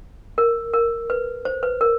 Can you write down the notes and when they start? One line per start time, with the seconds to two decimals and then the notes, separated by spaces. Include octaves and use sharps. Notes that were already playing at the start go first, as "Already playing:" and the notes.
0.38 A#4
0.73 A#4
1.10 B4
1.45 C5
1.63 B4
1.81 A#4